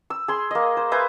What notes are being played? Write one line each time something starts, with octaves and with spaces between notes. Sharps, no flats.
E6
G#4 C6
A#3 D#5
C5
B4 C5 E5 G#5